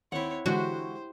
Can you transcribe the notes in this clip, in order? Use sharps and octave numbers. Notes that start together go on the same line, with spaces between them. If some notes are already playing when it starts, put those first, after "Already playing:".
D#2 C4 E4 C#5 F#5
D3 E3 G#3 E4 F#4 G4 C5